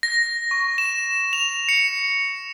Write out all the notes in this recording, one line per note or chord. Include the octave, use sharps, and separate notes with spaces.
A#6
C#6
E7
F7
C#7